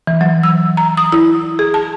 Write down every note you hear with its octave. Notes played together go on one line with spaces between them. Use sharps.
E3
F#3
E6
A#5
D#6
E4
G#4
A5